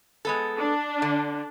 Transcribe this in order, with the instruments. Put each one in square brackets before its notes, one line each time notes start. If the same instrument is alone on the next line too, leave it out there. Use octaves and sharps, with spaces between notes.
[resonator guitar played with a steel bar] G#3 B3 A4
[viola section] D4
[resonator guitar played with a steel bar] D3